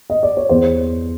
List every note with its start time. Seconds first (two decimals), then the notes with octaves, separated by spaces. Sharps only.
0.10 D#5
0.23 D5
0.37 C#5
0.49 E2 C5